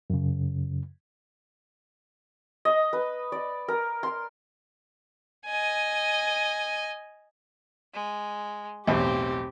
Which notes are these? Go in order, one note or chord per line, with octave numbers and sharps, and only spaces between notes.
F#2 C#3
D#5
B4
D5
A#4
C6
D#5 G#5
G#3
B1 E2 A2 C4 G4